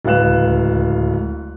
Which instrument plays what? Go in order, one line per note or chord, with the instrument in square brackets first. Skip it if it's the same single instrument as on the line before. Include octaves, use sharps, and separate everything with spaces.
[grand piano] D1 C#2 B4 F5 F#6 E7